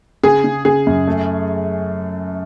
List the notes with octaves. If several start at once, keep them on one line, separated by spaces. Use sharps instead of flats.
C#3 G#4
C#3
C#3 G#4
F#2
A3